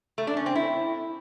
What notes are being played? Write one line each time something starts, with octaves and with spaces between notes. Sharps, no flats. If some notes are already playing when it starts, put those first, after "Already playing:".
A3
D4
C#4
C4
E4